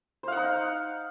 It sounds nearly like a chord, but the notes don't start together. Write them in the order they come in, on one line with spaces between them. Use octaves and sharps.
C5 F5 F#5 D#4